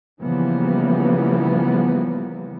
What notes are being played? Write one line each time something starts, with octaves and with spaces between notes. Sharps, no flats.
C#3 E3 F3 G3 A#3 B3